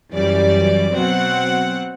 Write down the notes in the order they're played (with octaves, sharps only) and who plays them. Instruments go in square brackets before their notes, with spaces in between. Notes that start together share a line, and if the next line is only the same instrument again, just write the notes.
[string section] F#2 E3 G3 D5
B2 F#3 C4 F#5